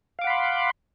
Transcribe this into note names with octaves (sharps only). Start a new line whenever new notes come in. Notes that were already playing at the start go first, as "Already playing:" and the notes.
F5 F#5 B5 C6 D6